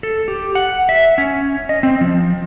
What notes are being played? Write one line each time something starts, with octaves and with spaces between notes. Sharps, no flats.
A4
G4
F#5
E5
C#4
D#5
C4
F3